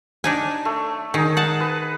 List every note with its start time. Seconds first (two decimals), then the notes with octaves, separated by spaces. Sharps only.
0.24 D4 D#4 G#5
0.65 A3
1.14 D#3 D#4 G#4
1.37 F#5 A5
1.60 B4